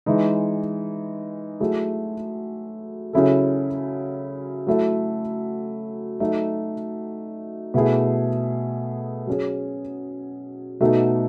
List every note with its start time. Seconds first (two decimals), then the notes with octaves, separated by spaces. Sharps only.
0.06 E3 G#3 D#4
1.60 F#3 A3 E4 G#4
3.13 C#3 F#3 C#4 E4 A4
4.67 F#3 A3 E4 A4
6.20 F#3 A3 D#4 A4
7.74 B2 A3 E4 G#4
9.27 F#3 C#4 G#4
10.81 B2 A3 D#4 F#4 A4